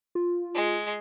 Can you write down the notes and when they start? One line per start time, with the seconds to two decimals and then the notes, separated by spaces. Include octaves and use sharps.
0.15 F4
0.55 G#3